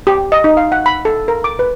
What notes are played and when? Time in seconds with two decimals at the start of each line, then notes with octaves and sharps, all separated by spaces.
0.07 G4
0.32 D#5
0.44 D#4
0.57 F5
0.72 F#5
0.86 B5
1.05 A4
1.28 A#4
1.44 D6
1.59 B4